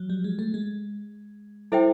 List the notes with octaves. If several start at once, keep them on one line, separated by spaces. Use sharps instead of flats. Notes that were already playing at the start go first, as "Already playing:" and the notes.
Already playing: F3 F#3
G3
G#3
A3
G#3
G3 E4 A4 C5 E5 G5